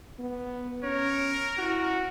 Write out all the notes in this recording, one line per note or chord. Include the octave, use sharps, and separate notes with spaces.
B3
C#4 A#4 C#5
E4 F#4